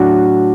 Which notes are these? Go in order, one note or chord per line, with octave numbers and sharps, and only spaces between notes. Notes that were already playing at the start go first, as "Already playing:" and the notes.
Already playing: A2 F#3 D4 F#4